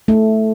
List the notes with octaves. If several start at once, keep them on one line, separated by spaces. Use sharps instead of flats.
A3